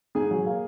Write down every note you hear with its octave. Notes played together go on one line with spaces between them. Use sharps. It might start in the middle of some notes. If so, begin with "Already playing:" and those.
G#2 G#4 G#5
F#3
A#3